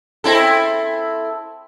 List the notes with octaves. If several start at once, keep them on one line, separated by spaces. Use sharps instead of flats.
C4 E4 A4